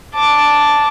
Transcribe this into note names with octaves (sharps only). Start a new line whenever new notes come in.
A5 D6